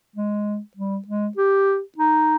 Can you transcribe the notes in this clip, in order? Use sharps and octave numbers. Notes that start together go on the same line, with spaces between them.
G#3
G3
G#3
G4
D#4